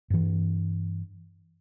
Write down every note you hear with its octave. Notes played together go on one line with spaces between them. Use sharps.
G2 E3